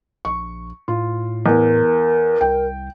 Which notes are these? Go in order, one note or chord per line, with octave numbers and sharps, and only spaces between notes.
A#1 C#6
A2 F4
E2 A#4
C2 G5